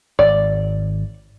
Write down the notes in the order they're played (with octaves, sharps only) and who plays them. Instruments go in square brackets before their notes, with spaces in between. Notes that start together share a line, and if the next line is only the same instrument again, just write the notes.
[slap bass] G#1 [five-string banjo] D5